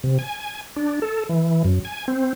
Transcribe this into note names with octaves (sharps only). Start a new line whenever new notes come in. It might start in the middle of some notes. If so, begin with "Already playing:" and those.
C3
G#5
D4
A4
E3
F#2
G#5
C4